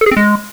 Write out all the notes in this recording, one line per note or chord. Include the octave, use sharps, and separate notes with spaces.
A4
G#4
C4
G#3